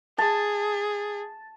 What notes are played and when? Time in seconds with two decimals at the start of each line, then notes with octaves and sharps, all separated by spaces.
0.18 G#4 A5